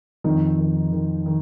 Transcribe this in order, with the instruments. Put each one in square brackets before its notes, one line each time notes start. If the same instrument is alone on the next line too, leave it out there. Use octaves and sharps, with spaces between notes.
[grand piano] F2 D#3 D#4
D#3
D#3
D#3